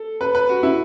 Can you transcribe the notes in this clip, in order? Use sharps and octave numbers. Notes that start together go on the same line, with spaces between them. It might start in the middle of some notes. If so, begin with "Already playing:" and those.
Already playing: A4
B4
B4
F#4
E4